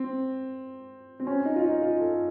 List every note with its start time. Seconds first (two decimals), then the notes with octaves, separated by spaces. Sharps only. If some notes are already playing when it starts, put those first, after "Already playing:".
Already playing: C4
1.20 C4
1.27 C#4
1.45 D#4
1.56 F4
1.64 D#4
1.82 F4
2.00 A4